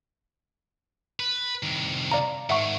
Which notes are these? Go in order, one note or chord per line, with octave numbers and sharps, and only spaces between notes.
B4
C2 D#3
D5 F5 A#5
G#2 D#3 E5 F#5 C#6